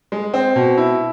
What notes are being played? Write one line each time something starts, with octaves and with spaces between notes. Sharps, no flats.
G#3
C4
B2
E4